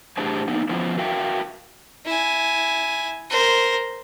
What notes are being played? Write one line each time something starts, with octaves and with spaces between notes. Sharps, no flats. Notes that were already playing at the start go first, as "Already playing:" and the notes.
A2 D4 G4 G#4 C5 A5
A#3 B3 D#4
F3 B3 C#4 E4 F4 C5
F#4 A#4 E5 F5 G5
E4 G#5
A#4 C5